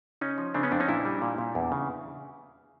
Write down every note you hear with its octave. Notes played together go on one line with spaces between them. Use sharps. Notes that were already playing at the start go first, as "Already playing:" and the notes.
C#3 C#4 D#4
F3
C#3 C4 D4
B3 C#4
F2 C4 D4
C#4 D#4
A#2 D4 E4
G3
A#2
A#2
E2
C#3